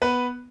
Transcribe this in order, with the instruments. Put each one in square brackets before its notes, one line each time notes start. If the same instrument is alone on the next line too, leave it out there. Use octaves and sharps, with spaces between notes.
[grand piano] B3 B4